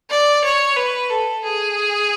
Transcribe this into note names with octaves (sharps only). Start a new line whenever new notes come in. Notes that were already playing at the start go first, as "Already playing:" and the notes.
D5
C#5
B4
A4
G#4